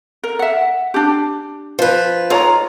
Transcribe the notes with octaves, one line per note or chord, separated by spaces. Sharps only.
A#4
E5 F#5
D4 G4
F3 B4
G#2 F4 C#5 A#5